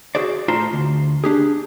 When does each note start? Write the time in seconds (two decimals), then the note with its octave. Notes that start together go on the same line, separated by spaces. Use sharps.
0.15 F#4 G#4 C5 D5
0.48 A2 F4 C5 A5 A#5 C6
0.73 D2
1.24 D4 G4 G#4